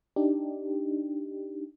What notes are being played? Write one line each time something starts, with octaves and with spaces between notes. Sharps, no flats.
D4 D#4 G4